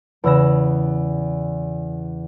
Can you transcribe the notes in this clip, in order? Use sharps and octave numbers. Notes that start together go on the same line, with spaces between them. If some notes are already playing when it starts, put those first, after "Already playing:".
E2 C#3 E6 F#6 A#6 E7